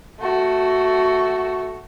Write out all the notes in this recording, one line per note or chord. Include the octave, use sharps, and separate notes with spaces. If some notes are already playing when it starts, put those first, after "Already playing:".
A3 F#4